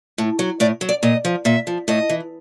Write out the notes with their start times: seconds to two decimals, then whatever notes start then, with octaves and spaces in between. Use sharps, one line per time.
0.18 A2
0.39 F#3
0.60 A2 D5
0.81 F#3
0.89 D5
1.03 A#2 D#5
1.25 F3
1.45 A#2 E5
1.67 F3
1.88 A2 D#5
2.09 E3